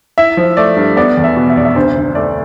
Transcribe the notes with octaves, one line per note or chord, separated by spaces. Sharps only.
E4 E5
F3
A3 D5
G2
B3 D5
E2
E5
B2
E5
F1 D5
E5
D2 C5
D3
A3 D5